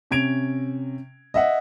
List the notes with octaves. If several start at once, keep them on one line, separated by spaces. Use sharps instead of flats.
C3 C#4 G#6 D7 F7
D#5 E5 F#5